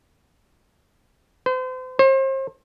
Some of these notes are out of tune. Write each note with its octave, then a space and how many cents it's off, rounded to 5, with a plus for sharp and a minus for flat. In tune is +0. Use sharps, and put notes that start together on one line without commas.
C5 -35
C5 +40